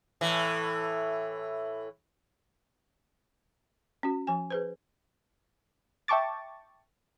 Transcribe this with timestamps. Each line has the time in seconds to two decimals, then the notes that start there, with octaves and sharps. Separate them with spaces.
0.21 A2 E3
4.03 C#4 F#4
4.27 F3 G#5
4.51 G#4 B4 C5
6.08 E5 G5 A5 C#6 D6 A6